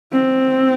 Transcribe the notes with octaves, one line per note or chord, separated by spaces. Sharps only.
C4